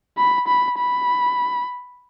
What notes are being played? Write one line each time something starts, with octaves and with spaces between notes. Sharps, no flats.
B5
B5
B5